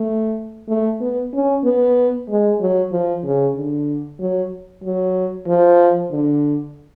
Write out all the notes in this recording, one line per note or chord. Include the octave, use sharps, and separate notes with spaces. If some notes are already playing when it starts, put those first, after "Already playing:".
Already playing: A3
A3
B3
C#4
B3
G#3
F#3
F3
C#3
D3
F#3
F#3
F3
D3